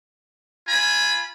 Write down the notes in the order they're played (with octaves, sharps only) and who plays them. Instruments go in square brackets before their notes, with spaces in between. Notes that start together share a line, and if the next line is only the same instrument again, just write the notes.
[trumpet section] F4 G#5 B5